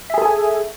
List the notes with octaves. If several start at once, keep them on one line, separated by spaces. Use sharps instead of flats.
G#4 A4 E5 G#5